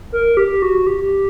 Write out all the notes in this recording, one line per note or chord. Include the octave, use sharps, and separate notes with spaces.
A#4
G4
F#4
G4